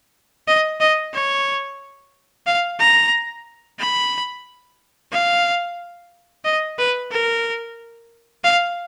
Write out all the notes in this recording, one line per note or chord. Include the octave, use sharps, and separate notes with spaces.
D#5
D#5
C#5
F5
A#5
B5
F5
D#5
B4
A#4
F5